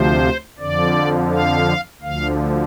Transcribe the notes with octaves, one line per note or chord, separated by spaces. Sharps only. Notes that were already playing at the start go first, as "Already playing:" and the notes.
Already playing: D2 C3 F3 C5
F2 D3 F3 D5
F5
D2 D3 F3 F5